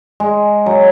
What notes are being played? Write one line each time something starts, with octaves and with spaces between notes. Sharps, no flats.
G#3
F#3